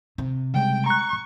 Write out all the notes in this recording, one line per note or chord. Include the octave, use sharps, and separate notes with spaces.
C3
C#3 G3 G#3 G5
A#5 C#6 F#6